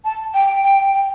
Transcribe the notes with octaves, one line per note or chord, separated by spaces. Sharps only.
A5
G5
G5
G5